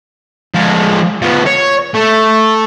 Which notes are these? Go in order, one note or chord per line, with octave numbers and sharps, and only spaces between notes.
F3 G#3
F3 B3
C#5
A3